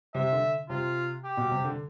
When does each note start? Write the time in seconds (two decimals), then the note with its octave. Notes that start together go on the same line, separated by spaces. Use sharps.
0.15 C3 E5
0.33 D3
0.69 C3 F4
1.25 G4
1.37 B2
1.51 C3
1.65 D3